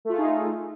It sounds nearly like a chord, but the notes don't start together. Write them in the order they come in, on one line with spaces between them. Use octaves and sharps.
A3 F4 G#4 D#4